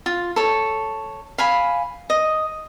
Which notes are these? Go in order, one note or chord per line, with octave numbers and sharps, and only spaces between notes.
F4
A4 C#5
F5 G#5 B5
D#5